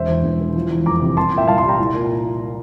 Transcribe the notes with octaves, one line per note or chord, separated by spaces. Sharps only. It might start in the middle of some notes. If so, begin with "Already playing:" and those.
Already playing: E1 C5 E5
E2
E1
E3
F3
E2
F1 A#5 D6
C3
C2 A5 C6
A#2
E5 G5
C2 F5 A5
A5 C6
G3
G5 A#5
C2
A#2